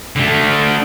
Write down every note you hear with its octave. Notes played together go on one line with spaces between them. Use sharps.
D3 A3